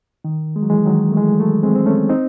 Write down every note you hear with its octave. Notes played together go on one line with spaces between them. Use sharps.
D#3
G#3
F#3
E3 G#3
D#3 F#3
A3
E3 G#3
F#3 A3
G#3 C4
C4
A3 C#4
C4 D#4